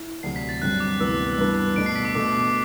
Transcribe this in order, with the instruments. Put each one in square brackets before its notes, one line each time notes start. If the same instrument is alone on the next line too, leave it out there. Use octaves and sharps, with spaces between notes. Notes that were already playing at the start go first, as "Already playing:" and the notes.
Already playing: [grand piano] E4
[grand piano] D2 C3 F#3 [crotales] C7
[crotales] B6
A6
[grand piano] G2 D3 F#3 C4 [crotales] F#6
[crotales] D6
[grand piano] D2 C3 E3 B3 [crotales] E6
[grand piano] G2 E3 B3 D4
[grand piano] B2 A3 D4 [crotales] D7
[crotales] C7
B6
D6
[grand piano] B2 A3 [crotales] D6